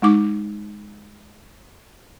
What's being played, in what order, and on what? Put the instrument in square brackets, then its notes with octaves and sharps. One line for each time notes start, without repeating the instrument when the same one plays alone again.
[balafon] G#3 D#4 D6